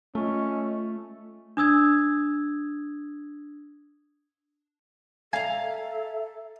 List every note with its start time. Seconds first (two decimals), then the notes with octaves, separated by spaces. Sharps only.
0.15 A3 C#4 F4 D#5
1.57 D4 D#6 E6 G#6
5.33 A4 E5 F5 G#5 A#5